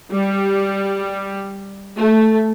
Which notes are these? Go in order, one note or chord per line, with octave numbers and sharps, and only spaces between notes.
G3
A3